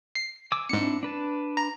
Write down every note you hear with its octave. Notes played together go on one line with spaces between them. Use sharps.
C7
G#5 D6 E6
G#2 C4 D4 E4 C#7
D4 B4 A5
A#5